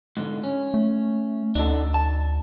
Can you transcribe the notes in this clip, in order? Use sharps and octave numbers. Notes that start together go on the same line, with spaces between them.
G#2 D3
C#4
A3
D2 D4 D#4 A4
A5